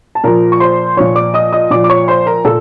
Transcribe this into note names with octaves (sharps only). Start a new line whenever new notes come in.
A5
A#2 F3 A#4 A#5
C#6
C5 C6
A#2 F3 C#5 C#6
D5 D6
D#5 D#6
D#5 D#6
A#2 F3 D5 D6
D6
C#5 C#6
C5 C6
A#4 A#5
A#2 A4